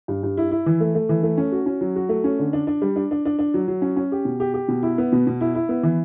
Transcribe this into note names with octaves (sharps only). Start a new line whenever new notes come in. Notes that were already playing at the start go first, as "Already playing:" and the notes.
G2
G2
E4
E4
E3
A3
A3
E3
A3
C#4
F#4
C#4
F#3
F#4
A3
C#4
D3
D4
D4
G3
D4
D4
D4
D4
F#3
F#3
C#4
C#4
G4
B2
G4
G4
B2
E4
B3
B2
B2
E4
E4
B3
E3